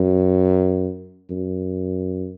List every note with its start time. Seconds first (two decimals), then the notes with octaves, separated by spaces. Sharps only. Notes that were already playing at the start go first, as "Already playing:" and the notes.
Already playing: F#2
1.31 F#2